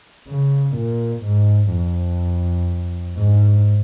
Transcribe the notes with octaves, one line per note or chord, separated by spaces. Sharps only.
C#3
A#2
G#2
F2
G#2